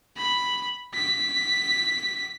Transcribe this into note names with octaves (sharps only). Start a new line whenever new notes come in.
B5
B6